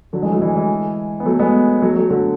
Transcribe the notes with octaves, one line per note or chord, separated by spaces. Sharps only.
D3 F#3
E3 G#3
F#3 A3
E3 G#3
E3 G#3
B3
F#3 A3
G#3 B3
F#3 A3
F#3 A3
D3 F#3